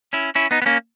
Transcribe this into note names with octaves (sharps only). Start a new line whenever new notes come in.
C#4 E4
C#4 E4
B3 D#4
B3
A#3 C#4